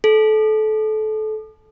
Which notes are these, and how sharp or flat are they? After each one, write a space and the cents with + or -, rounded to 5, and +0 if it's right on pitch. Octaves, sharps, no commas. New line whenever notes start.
A4 -25